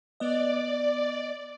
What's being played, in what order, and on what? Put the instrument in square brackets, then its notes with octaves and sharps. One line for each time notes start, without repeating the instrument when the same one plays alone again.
[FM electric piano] B3 D#5 [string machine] D5